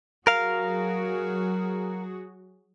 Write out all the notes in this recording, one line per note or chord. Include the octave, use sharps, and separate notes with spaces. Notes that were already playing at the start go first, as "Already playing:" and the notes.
F#3 F#4 G#4 A#4 F5